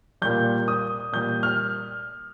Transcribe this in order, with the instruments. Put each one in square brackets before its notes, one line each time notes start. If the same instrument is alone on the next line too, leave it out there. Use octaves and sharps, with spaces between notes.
[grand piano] A#2 G3 G6
D#6
A#2 G3 G6
F6